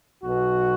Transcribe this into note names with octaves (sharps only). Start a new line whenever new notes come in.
B1 B2 F#4